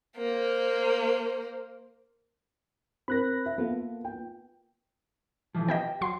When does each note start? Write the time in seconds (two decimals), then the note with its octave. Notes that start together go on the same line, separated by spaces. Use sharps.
0.17 A#3 C5
3.08 C4 A#4 B5 F#6 A#6
3.46 E5
3.58 A#3 B3 F4 A4
4.04 G5
5.55 B1 E3 F3
5.68 B3 G4 D#5 G5
6.01 F#3 C6